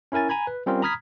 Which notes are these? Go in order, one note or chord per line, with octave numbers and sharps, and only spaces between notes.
C#4 E4 A#4 G#5 A6
G#5 A#5 B5 G#6
B4
G3 C4 C#4 F4 A#4
A#5 B5 D#6 F6 G#6 B6